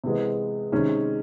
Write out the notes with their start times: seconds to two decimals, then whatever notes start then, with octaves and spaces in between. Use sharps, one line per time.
0.04 C3 E3 G#3 B3
0.72 C3 D#3 G#3 C#4